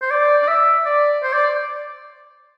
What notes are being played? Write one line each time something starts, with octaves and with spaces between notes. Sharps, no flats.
C5
D5
D5
E5
D5
C5
D5